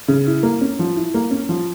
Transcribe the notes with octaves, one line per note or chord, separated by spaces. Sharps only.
C#3
E4
A#3
C#4
F3
E4
A#3
C#4
F3